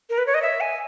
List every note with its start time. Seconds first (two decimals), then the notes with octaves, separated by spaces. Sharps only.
0.10 A#4
0.18 B4
0.26 C#5
0.34 D#5
0.42 E5
0.61 G#5